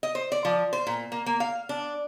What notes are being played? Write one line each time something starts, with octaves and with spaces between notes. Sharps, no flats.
D#5
C5
D5
F3
C5
A#2
A#3
A#3
F5
D4